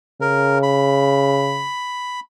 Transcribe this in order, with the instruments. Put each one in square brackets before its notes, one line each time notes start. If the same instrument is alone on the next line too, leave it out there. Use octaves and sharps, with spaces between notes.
[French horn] C#3 [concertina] A#4
[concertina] B5